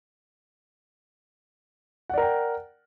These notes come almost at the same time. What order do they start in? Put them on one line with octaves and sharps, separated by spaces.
F#5 D5 A#4 G5